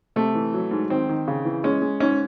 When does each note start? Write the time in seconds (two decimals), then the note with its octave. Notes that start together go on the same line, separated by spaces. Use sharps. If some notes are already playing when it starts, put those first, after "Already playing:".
0.16 C3 A3
0.35 E3
0.54 F#3
0.71 G#2
0.90 D#3 C4
1.09 D#3
1.28 C#3
1.45 E3
1.64 G#3 C#4
1.82 G#3
2.00 G#2 C#4